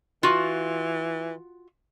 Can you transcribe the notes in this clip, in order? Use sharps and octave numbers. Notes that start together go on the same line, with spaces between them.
E3 F4 F#4